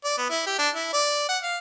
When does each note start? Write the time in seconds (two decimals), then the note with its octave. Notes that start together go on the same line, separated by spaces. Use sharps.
0.04 D5
0.18 B3
0.30 E4
0.46 G4
0.59 D4
0.75 E4
0.93 D5
1.29 F#5
1.43 F5